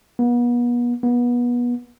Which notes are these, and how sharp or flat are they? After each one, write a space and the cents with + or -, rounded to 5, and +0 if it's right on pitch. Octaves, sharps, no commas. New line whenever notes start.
B3 -40
B3 -30